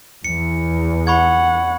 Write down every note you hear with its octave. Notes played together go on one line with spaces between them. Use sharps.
E2 C#7
F#5 B5 C#6 G#6